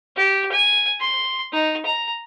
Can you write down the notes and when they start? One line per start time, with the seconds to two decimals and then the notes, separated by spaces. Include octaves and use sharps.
0.17 G4
0.53 G#5
1.01 C6
1.53 D#4
1.86 A#5